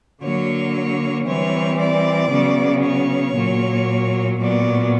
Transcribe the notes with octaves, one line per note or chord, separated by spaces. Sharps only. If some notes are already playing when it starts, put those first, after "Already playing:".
D3 F#3 A#3 C#5
E3 G3 C4 C#5
D5
C#3 F#3 B3
C#5
A#2 F#3 A#3
A#2 F#3 B3 D5